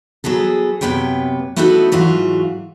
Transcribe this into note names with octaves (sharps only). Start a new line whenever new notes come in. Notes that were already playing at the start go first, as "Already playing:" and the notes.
F#3 B3 G#4 A4
F#2 C3 B3 B4 C#5 G5
A3 B3 D#4 E4 F#4 A4
G#2 E3 F#3 F4 F#4